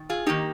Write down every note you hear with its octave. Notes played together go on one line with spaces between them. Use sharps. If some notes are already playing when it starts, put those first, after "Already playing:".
Already playing: D#3
F4 G#4
D#3 A#3 D#4 G4